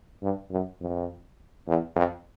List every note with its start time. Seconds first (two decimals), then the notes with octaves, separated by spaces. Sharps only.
0.23 G2
0.51 F#2
0.81 F2
1.67 E2
1.96 F2